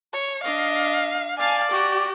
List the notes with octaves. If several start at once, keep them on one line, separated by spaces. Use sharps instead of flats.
C#5
D4 D#5 F5
D5 F5 G#5 A5
F#4 G4